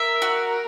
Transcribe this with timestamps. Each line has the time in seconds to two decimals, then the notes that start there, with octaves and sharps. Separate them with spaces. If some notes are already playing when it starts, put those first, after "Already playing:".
Already playing: A#4 E5
0.22 F#4